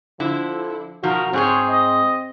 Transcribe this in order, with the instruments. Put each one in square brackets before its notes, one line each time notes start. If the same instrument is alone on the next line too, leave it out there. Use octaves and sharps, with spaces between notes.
[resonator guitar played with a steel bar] D3 E4 [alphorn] F3
[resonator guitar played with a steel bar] B2 F3 D#4 [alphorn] F#4 [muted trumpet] A#4
[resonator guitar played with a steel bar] G#2 G#4 C5 [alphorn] C4 [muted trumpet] C#5
[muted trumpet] D#5